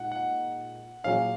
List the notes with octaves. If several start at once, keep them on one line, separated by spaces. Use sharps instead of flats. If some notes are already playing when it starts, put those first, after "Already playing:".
Already playing: A#2 G#3 D#4 F#5
F#5
A#2 F#3 C#4 G#4 F5